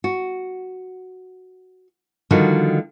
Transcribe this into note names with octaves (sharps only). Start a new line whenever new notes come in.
F#4
D3 D#3 F3 G3 D#4 F#4